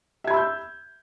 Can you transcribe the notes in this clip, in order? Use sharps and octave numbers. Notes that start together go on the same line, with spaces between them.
E5 B5 E6 G6 G#6